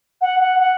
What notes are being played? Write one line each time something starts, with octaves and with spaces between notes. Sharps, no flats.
F#5
F#5
F#5